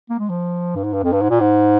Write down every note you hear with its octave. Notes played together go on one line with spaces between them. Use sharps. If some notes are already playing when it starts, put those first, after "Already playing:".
A#3
G#3
F3
G2
G#2
G2
F2
G2
G#2
A#2
G#2